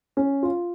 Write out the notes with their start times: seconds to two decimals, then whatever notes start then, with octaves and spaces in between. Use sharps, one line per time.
0.17 C#4
0.43 F4